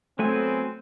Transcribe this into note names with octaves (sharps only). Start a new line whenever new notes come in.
F#3 A3 B3 C4 G#5